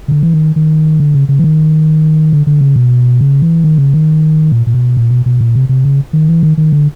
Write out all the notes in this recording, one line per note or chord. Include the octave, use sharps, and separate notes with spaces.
C#3
D3
E3
D#3
D#3
D3
C#3
C#3
E3
D#3
D3
D3
C#3
B2
C#3
E3
D#3
C#3
D#3
A#2
A#2
B2
A#2
B2
B2
A#2
C3
C3
C#3
D#3
E3
D#3
D#3
D3